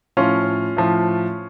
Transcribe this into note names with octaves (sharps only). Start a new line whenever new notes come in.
A2 F3 C#4 F4
A2 F3